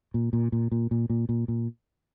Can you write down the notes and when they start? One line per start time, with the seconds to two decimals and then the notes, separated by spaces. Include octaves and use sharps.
0.14 A#2
0.33 A#2
0.52 A#2
0.72 A#2
0.91 A#2
1.10 A#2
1.29 A#2
1.48 A#2